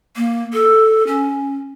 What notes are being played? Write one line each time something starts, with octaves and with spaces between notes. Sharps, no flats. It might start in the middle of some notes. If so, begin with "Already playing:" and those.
A#3
A4
C#4